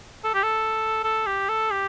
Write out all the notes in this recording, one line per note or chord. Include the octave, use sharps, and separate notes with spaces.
A4
G4
A4
A4
G4
A4
G4